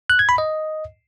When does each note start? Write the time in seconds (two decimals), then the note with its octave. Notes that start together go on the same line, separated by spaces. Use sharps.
0.10 F#6
0.19 G#6
0.29 B5
0.38 D#5